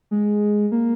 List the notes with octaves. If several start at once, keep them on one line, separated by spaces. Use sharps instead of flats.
G#3
A#3